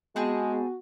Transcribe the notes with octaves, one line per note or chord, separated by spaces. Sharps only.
G#3 B3 C4 F#4 G#4 A5